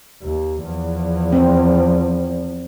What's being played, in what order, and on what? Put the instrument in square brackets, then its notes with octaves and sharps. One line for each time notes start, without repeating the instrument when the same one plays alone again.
[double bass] D#2
E2 F3
[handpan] C4